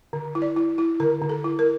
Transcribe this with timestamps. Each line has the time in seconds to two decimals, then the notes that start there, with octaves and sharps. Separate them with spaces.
0.13 D3
0.35 E4
0.42 D5
0.56 E4
0.78 E4
1.00 D3 A#4
1.22 D3
1.29 A4
1.44 E4
1.59 A#4